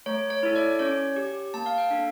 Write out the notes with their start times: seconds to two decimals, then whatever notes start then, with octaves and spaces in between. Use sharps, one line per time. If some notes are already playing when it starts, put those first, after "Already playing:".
0.06 A3 C#5
0.30 C#5
0.43 E4 A4
0.56 D5
0.79 C#4 C#5
1.16 G4
1.54 A#3 A5
1.66 F5
1.78 G5
1.91 D4 A4